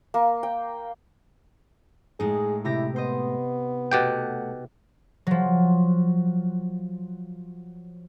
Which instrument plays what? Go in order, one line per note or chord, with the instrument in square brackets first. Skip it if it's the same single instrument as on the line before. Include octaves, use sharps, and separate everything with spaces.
[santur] A#3
G5
[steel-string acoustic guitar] A2 G#3 [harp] D#4 [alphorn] G#4
[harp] C3 G4 A#6 [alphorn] E4
[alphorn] B3 [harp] C5 D#5
[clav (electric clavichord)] B2 G4 G5 [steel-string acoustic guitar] A3 F#5
[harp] F3 F#3